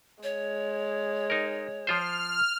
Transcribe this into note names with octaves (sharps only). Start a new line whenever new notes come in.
G#3 C#5
D#4 A#4
F3 F4 C5 F6